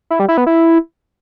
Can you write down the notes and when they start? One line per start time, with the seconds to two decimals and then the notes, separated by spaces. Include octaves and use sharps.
0.10 E4
0.19 G3
0.29 E4
0.38 B3
0.47 E4